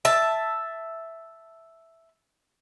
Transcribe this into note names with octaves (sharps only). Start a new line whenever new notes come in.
E5 A5